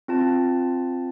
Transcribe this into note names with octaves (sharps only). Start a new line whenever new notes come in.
C4 F4 A5